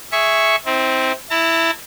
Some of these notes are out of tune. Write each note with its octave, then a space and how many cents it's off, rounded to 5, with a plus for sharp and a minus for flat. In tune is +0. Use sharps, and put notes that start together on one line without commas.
G#4 +0 E5 +0 C#6 +0
C4 +0 E4 -45
E4 +0 A5 +45